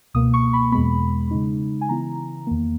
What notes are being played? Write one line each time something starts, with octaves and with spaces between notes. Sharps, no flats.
C#2 B2 A#3 D#6
C#6
B5
E2 B2 G#3 B3 B5
C#3 G#3 D#4
G#5
C#3 E3 B3 E4 A#5
E2 D#3 A#3